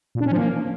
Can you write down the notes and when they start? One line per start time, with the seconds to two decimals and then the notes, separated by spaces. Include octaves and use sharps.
0.15 A#2
0.21 D4
0.26 C#4
0.32 F3
0.37 A#3